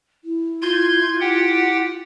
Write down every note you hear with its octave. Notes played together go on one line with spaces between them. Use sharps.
E4
F4 C6 G6 G#6
G4 F#5 G5